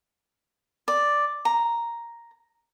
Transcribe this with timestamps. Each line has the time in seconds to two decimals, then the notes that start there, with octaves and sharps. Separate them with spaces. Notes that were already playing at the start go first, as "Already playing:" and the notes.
0.88 D5
1.45 A#5